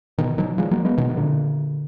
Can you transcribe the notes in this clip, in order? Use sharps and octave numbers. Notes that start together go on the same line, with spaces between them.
B2 D#3
D#3 F#3
F3 G#3
F#3 A#3
G#3 B3
B2 D#3
D#3
A#2 D3